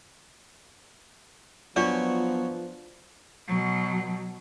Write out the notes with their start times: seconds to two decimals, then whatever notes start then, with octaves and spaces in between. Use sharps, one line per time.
1.76 F3 F#3 B3 D4 F4 F#4 C#5 D5
3.48 B2 F#3